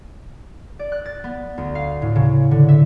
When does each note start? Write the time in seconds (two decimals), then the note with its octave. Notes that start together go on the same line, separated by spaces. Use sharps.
0.79 D5
0.92 F#6
1.06 A6
1.24 B3
1.58 D2
1.75 F5
2.02 A2
2.16 C#3
2.51 D3
2.69 E5